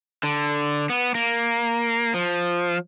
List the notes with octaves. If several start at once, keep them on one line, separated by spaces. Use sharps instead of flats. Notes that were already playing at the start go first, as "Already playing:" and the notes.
D3
B3
A#3
F3